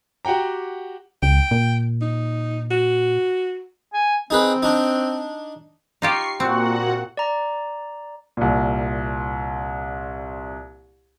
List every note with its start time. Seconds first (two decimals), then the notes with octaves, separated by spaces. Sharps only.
0.25 F#4 G4 F#5 G5 A#5
1.23 C#2 G5
1.51 A#2
2.01 D#4
2.71 F#4
3.93 G#5
4.30 C4 D#4 G#4 B4
4.62 D4 D#4
6.02 D#4 F4 G4 C#6 C7
6.40 A#2 C4 F#4 F#5
7.17 D5 A#5
8.37 C2 A#2